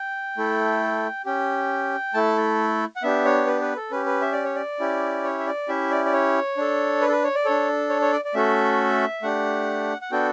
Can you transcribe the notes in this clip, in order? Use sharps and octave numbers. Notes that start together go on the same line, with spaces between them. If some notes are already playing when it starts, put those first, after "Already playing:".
Already playing: G5
A3 E4 A4
C#4 G4 G5
A3 E4 A4 A5
F#5
B3 D4 G4 E5
C#5
B4
B4
A4
C#4 G4 B4
B4
E5
D5
C#5
D5
C#4 E4 G4
C#5
E5
D5
C#4 E4 G4 E5
D5
D5
C#5
D4 A4
B4
A4
B4
C#5
D5
D4 A4 C#5
C#5
C#5
D5
D5
A3 C#4 F#4 A4 E5
A3 D4 G4 F#5
F#5
B3 D4 F#4 A4 G5